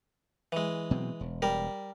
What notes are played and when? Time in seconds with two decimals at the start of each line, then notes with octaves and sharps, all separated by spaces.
0.52 E3 G#3
0.91 B2 F#3 C4
1.21 E1
1.42 G3 A#4